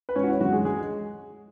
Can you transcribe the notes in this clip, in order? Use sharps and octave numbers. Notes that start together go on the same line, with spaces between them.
B4
G#1 C#4 C#5
F#4
E4
F#2 D3 G#3 F#4
G#3 G#4
G#3 G#4